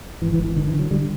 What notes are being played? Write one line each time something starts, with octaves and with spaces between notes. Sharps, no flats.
G#1 E3
E3
G#1
E3
D3 D#3
E3
D3
F#3
D3 G3